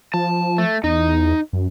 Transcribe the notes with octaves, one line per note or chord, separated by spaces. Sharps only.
F3 A5
A3
E2 D#4
F#2